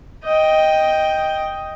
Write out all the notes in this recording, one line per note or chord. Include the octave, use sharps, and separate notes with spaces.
D#5 G5